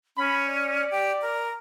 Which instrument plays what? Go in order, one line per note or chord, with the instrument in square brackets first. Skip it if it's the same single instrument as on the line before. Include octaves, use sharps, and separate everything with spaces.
[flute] C#4 [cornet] B5
[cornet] D5
[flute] G4
A#4